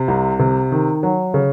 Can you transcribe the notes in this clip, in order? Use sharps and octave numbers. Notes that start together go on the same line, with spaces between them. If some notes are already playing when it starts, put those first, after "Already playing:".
Already playing: C3
C2
C3
D#3
F#3
C#3